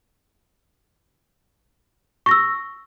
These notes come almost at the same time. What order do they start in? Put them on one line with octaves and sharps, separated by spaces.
C#6 A#6 E6